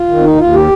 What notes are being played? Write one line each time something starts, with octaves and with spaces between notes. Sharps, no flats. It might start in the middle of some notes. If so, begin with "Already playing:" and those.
Already playing: F4
D#3
C4
D#2 D#4
D#2 F4
G4